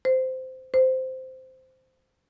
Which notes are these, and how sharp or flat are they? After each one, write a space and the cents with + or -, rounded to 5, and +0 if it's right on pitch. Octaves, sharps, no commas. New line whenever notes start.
C5 -15
C5 -10